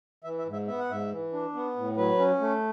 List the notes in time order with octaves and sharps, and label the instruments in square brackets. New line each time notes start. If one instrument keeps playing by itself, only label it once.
[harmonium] E3 E5
E5
G#2
E5
B3 E5
F#5
G#2 E5
E3
D4
B3
A2
F#3 B4
C#4
A3